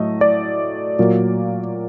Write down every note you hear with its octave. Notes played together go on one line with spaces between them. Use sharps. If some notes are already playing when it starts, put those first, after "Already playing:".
Already playing: A2 F#3 A3 D#5
D5
A#2 F#3 A#3